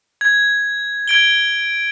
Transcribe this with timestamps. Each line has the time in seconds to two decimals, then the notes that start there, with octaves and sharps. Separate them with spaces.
0.21 G#6
1.08 G#6 D7 G7